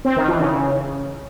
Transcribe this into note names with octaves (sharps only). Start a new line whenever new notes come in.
C4
D#3
E3
C#3